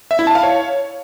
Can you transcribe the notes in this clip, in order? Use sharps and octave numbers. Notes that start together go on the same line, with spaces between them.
E5
E4
A5
F5
C#5